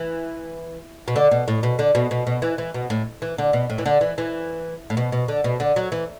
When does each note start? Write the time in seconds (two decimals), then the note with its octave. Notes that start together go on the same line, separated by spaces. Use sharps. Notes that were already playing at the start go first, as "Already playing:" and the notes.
Already playing: E3
1.08 B2
1.16 D3
1.31 B2
1.48 A2
1.63 B2
1.79 D3
1.95 B2
2.11 B2
2.27 B2
2.42 E3
2.58 E3
2.74 B2
2.90 A2
3.22 E3
3.38 D3
3.53 B2
3.70 A2
3.78 E3
3.86 D3
4.01 E3
4.18 E3
4.90 A2
4.97 B2
5.12 B2
5.28 D3
5.44 B2
5.60 D3
5.76 F#3
5.92 E3